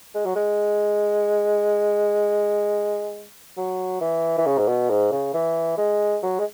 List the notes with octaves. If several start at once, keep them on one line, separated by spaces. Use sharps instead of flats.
G#3
F#3
G#3
F#3
E3
E3
C#3
G#2
B2
G#2
C#3
E3
G#3
F#3
G#3